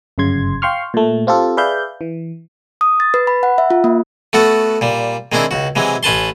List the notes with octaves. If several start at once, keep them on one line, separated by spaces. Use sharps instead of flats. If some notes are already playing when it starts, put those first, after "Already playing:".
G1 F#2 C#3 C6 G#6
F5 G5 C6 C#6 F6
A#2 A3
C4 F4 G4 A4
G#4 B4 D5 E5 F5 G6
E3
D#6
A6
B4
B5
F#5
E5
F4
A#3
A3 B3 F#4 A4
A#2 G3
D#3 G#3 C4 D4 E4
C#2 F#4
C3 E3 F#3 G#3
A1 C#4 B4 A5 C6